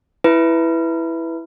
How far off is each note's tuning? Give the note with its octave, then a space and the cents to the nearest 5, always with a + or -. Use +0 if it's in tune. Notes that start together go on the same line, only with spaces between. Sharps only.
E4 +0 B4 +0